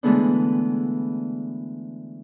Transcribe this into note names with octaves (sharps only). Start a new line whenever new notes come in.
D3 E3 G#3 A3 B3 D4